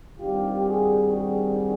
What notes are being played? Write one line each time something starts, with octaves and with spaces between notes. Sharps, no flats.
G2 D#3 G3 C4 F4 G4
F#4 G#4
F#4 G#4